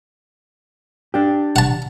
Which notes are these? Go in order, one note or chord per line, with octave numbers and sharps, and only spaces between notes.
D4 G4
F#5 A5